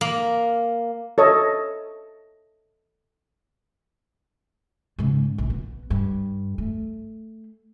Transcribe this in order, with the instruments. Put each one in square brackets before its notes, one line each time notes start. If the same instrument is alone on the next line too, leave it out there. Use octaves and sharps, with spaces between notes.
[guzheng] A#3
[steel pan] A4 C#5 D#5
[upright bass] G#2 C#3
A#1
B3
G2
A3